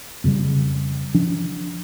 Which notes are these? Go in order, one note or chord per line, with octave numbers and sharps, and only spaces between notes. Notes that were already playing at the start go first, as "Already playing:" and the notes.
F2 C#3 G3
F3 D4